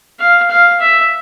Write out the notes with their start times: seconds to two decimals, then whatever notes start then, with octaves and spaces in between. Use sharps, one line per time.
0.20 F5
0.50 F5
0.80 E5